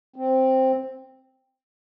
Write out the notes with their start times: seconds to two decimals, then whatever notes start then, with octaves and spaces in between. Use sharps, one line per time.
0.16 C4